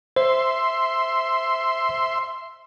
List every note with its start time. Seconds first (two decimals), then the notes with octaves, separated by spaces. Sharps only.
0.17 C5 E5 C6